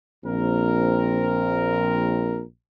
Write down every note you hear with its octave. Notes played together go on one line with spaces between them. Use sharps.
A#1 C4 A#4